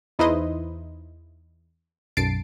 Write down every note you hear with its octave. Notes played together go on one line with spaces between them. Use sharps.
E2 D#4 E4 B4 C5 D#5
B1 F#2 A5 A6 C7 D7